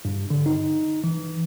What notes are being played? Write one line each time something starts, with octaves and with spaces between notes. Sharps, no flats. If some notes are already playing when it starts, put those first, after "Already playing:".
G2
D3
D#4
E3